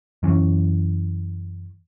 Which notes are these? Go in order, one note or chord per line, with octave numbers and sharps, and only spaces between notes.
F#2 E3 C#4